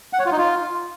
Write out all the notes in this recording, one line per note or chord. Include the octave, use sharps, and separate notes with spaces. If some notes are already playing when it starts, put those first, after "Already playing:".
F#5
C#5
F4
D#4
F4